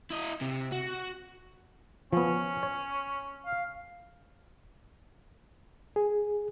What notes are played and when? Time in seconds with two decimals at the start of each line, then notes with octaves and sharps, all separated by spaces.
0.10 E4 D#5
0.41 C3
0.72 F#4
2.13 F3 B3 C#4
2.63 C#5
3.45 F5
5.96 G#4